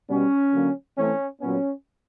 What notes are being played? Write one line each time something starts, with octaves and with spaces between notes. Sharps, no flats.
B2 G3 B3 C#4
D3 F#3 A#3
E3 A3 C4 C#4
A#2 F#3 B3 C#4